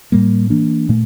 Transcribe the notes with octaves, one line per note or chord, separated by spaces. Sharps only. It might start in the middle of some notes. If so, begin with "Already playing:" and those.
A2 G3 A#3
E3 A#3 D4
A#2 A3